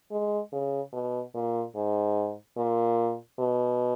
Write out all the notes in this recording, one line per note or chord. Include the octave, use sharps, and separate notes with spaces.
G#3
C#3
B2
A#2
G#2
A#2
B2